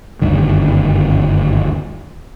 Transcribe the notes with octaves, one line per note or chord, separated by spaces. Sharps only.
F#1 D2 G2 D#3